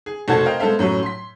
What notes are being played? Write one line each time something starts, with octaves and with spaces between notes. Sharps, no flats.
G#4
F1 F#4 A4 C5 G#6
A#4 C5 D#5 F5 G5
G#3 B3 A4 C5 E5 F5
F#2 A2 F#3
C6 B6